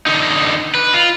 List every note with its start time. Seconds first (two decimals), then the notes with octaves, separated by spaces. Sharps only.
0.06 D3 D#4
0.75 B4
0.94 F4